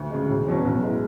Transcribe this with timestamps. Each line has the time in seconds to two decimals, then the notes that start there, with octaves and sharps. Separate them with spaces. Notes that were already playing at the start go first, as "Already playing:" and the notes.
Already playing: D2
0.11 C#3 G#3
0.29 E1
0.47 E2 B2 F#3 C#4
0.65 B1
0.83 A2 G#3